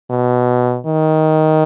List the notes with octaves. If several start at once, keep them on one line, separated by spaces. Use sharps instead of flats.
B2
D#3